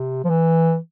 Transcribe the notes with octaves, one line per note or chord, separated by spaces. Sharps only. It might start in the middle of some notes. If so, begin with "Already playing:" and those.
Already playing: C3
F3
E3